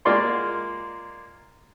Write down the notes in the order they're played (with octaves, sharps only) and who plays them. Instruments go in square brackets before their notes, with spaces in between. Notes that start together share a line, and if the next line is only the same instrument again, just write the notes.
[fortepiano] G#3 A#3 F4 D5 C6